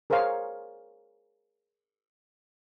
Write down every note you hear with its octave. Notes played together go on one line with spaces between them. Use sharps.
G#4 A#4 C5 C#5 F5